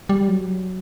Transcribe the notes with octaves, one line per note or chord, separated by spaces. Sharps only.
G3
F#3